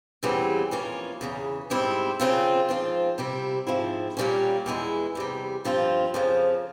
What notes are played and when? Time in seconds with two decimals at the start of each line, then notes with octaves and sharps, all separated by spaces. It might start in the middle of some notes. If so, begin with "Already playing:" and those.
0.23 E2 C#3 E3 G3 C4
0.71 F2 E3 A#3 C#4 F4
1.21 E2 C#3 E3
1.70 G#2 G3 C4 E4
2.20 C#3 F3 C4 F4
2.69 G#2 F3 C4 F4
3.18 C3 G3 C4 E4
3.67 G#2 F3 C4 E4
4.17 A#2 G3 A#3 C#4
4.66 E2 E3 G#3 E4
5.15 E2 C3 G3
5.65 G2 F3 C4 F4
6.14 F2 C#3 F3